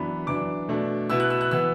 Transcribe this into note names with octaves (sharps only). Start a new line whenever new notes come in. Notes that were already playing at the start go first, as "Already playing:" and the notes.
Already playing: F#2 E3 B3 D4 B5
F#2 E3 D4 D6
B2 A3 D4
B2 B3 E4 E6
F#6
E6
F#6
E3 B3 E6